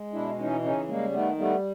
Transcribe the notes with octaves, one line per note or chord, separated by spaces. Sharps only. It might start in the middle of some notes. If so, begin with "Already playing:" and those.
Already playing: G#3
B2 D4 E4
E3 C#4 D#4
C#3 C#4 D#4
G3 G#3 A#3
D#3 A3 B3
G3 A3 B3